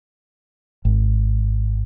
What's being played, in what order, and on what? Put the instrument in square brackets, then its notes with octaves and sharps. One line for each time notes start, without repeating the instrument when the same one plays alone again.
[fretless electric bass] G#1